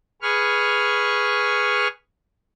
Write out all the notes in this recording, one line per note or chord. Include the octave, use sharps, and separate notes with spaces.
G#4 B4 C#6 F6